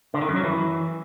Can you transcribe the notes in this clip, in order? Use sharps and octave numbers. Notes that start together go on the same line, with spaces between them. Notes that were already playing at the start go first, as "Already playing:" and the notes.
D3
D#3
F#2
F#3
E3